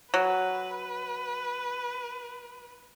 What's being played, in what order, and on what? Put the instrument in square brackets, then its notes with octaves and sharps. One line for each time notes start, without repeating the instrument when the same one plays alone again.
[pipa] F#3 [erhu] B4